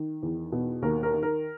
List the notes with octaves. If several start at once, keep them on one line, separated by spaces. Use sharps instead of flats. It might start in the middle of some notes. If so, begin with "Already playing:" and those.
Already playing: D#3
E2
B2
D#2 A#4
A#4
D#3
A#4